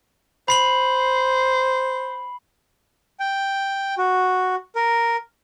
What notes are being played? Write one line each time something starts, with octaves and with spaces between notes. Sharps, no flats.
C5 B5 C7 F#7
G5
F#4
A#4